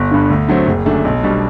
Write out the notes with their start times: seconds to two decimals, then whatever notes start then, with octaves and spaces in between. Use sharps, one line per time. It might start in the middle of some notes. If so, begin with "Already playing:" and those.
Already playing: G1
0.11 G2 D3
0.30 D2
0.48 D3 F#3 A3 C4
0.67 F#1
0.86 F#2 D3 A3 D4
1.05 B1
1.23 B2 G3 D4